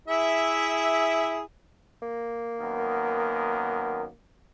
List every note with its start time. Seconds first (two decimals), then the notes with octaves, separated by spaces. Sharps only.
0.08 E4 G#4 E5
2.02 A#3
2.61 F#2 D#3 B3